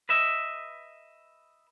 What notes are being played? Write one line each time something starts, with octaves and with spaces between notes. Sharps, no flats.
B4 D#5 E5